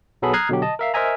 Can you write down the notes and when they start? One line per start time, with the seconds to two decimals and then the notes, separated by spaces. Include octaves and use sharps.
0.22 B1 F#3 B3 G#4 A4 B5
0.33 A#5 D#6 F6 F#6 G#6 C7
0.49 B2 D3 F#3 G4
0.62 D#5 A5
0.79 A#4 E5 F5
0.94 A#4 C5 D#5 E5 G#5 A#5